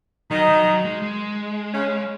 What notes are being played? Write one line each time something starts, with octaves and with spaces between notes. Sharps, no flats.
D#3 F#3 D#4
F#3
F#3
G#3
G#3
C#3 C#4